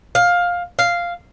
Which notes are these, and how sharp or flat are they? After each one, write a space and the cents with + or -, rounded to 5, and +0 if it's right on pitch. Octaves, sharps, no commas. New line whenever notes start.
F5 +15
F5 -5